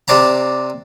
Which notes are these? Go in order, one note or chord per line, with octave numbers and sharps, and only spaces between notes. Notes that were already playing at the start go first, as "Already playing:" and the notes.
C3 D4 A5 A#5